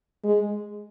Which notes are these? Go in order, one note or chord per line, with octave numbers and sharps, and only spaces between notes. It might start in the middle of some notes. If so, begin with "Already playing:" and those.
G#3